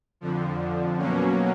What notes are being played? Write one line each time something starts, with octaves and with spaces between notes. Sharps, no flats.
F2 D3 F3
B2 F#3 A#3 C#4